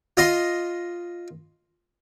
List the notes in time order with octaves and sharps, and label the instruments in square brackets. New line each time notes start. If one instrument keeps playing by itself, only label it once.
[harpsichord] F4 D#5 C6